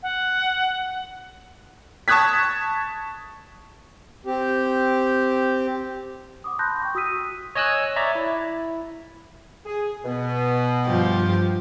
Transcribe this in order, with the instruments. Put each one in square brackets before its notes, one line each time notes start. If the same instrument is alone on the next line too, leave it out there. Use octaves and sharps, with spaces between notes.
[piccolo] F#5
[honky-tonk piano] A5 C#6 D#6 F#6 G#6 B6
[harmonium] C4 G4
[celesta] F#5 D6 D#6
A5 B5 C6 F#6 G6 A#6
G5 C#6
F#4 D#6 E6 B6 D#7
[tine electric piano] C#5 D#5 G#5 E6 F#6
C#5 D5 E5 A#5
E4
[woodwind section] G#4
B2 B3
[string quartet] G2 F3 G4